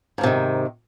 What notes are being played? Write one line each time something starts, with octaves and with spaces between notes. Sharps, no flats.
G#2 C3 D#3 F3